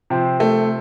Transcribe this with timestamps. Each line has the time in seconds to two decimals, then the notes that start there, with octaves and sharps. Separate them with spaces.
0.10 C3 F3 C4
0.40 A3